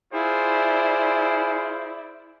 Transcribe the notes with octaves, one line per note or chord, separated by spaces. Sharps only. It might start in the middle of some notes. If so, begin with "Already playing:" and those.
E4 F4 G#4 C5 D5